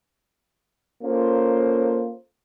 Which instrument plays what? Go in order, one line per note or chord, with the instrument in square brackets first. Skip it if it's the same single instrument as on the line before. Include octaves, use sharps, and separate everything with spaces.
[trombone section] A#3 C#4 F4 A4 C5